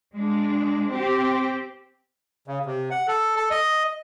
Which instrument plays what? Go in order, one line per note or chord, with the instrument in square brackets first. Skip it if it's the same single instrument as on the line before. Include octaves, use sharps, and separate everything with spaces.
[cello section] G#3 D4
C4 G4
[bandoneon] C#3
C3
F#5
A4
A4
D#5